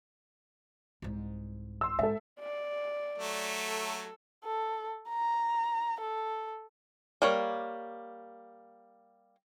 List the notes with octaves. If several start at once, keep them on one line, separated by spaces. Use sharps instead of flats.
C2 G#2
C6 E6
G#2 A4 E5
D5
F#3 A3
A4
A4
A#5
A4
G3 A#3 C#5